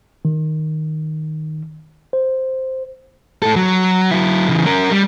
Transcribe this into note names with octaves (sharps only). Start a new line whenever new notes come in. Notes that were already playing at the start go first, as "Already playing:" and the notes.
D#3
C5
A2 A4
F#3
F#3 E4
C#3 E3
C#4 A#4
G3